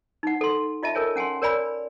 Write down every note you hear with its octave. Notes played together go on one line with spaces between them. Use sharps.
D#4 F#5
A4 C6
F4 D#5 E5 A5
A4 A#4 C#5 G#5
C#4 F#5 G#5 A5 C6
A#4 C#5 D5 G#5 B5